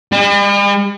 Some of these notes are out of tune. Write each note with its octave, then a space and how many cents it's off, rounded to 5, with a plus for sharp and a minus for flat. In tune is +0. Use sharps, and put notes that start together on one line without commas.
G3 +45